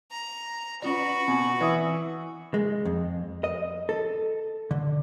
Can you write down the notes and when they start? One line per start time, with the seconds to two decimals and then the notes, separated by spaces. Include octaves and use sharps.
0.11 A#5
0.82 C#4 F4 F#4 B4 D5
1.28 B2 C4 G#5
1.61 E3 D5 E5 D#6
2.54 G#3
2.85 F2
3.44 D#5
3.89 A4
4.71 D3